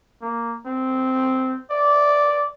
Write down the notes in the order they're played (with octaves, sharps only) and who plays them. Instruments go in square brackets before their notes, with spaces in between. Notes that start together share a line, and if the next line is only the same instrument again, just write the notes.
[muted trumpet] A#3
C4
D5